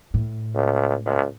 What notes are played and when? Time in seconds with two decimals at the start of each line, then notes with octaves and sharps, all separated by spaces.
0.14 A2
0.55 C#2
1.06 C#2